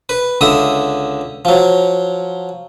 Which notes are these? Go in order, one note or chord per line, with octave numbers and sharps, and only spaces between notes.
B4
C#2 D3 E5 D#6
F3 F#3